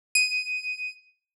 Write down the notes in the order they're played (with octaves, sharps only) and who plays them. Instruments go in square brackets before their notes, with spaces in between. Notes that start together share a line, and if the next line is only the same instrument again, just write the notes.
[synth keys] D#7